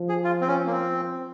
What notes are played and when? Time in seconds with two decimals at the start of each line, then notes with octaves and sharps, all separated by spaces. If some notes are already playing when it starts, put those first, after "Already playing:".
Already playing: F3
0.09 G#4
0.24 F4
0.41 C4
0.48 C#4
0.67 A#3
0.72 C4